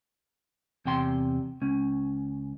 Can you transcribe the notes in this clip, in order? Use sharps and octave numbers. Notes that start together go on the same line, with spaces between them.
E2 C3 G5 C6
C#2 C#4